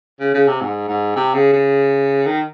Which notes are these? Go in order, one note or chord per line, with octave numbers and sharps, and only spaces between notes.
C#3
C#3
C3
G#2
G#2
C3
C#3
C#3
D#3